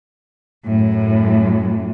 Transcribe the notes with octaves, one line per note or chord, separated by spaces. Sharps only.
F#2 A2